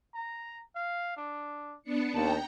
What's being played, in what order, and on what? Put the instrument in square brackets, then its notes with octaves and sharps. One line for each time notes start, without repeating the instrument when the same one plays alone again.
[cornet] A#5
F5
D4
[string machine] B3 D4 C#7
[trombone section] D#2 [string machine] G5 A#5 [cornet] A5